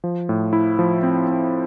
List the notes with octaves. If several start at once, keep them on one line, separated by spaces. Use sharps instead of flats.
F3
A2
E4
F3
C4
C4